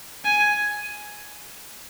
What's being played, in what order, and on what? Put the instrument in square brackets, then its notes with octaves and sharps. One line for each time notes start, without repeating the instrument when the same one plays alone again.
[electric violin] G#5